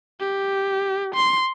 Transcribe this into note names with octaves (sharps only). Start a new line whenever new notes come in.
G4
C6